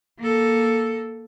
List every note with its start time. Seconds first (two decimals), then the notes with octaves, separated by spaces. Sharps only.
0.19 A#3 A4